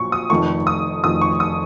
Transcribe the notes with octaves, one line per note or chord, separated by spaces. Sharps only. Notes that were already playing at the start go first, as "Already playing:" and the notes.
Already playing: A#1 A#2 F#3 C#6
D#6
F1 F2 D#3 A3 C#6
D#6
F1 F2 D#3 A3 D#6
C#6
D#6